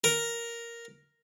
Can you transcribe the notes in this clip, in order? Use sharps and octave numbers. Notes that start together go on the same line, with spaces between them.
A#4